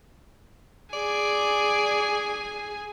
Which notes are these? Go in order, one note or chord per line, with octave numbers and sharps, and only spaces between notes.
G#4 D5 G#5